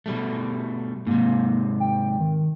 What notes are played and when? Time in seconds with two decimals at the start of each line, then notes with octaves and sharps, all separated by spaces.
0.06 B2 G3 A3
1.07 G#2 C3 A#3
1.80 G5
2.20 D#3